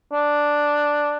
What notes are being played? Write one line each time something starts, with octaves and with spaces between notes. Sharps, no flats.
D4